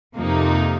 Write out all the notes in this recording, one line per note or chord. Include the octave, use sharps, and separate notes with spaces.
F2 C3 F3 A#3 D#4